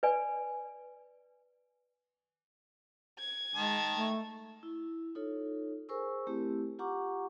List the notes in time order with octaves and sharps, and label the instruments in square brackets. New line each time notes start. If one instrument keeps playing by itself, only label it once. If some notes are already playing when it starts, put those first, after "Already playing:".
[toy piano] B4 D5 G#5
[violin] G#6
[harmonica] D#3 A5 [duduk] G#3
[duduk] A3
[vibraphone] E4
D#4 F4 A4 C#5
G#4 A#4 C5 G#5 C#6 E6
A3 C4 E4 G4
F4 G4 F#5 A#5 C#6 D6